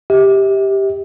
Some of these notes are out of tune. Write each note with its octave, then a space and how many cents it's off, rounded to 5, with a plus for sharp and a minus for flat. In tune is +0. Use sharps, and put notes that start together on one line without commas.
G4 +0 E5 -40